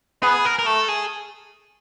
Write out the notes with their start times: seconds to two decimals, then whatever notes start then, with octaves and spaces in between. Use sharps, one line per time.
0.23 B3 G#4
0.45 A#4
0.59 A#4
0.66 A3 A4
0.88 G#4